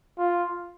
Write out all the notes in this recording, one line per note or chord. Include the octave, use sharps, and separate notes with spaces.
F4